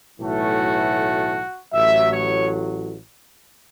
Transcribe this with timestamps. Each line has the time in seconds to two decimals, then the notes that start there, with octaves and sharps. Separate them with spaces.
0.19 B1 A2 E3 A3 F#4
1.73 A1 A2 F#3 E5
2.11 C#5